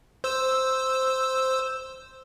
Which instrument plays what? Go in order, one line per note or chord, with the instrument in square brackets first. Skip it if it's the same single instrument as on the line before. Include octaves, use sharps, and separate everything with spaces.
[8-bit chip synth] C5 E6